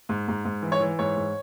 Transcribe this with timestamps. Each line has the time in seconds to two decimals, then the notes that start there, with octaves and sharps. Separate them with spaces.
0.09 G#2
0.28 G#2
0.45 G#2
0.63 E3
0.72 C#5
0.81 E3
0.99 G#2 C#5
1.17 G#2